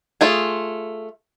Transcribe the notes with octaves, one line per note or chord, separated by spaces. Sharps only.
A3 F4 G#4